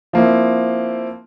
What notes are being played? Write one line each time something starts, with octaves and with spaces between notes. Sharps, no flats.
F3 A#3 C4 E4